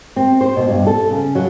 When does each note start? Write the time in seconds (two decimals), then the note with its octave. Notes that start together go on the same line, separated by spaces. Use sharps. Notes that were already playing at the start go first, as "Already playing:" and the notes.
0.16 C4
0.41 C5
0.56 B2
0.69 G2
0.87 A4
1.11 C#3
1.35 F#3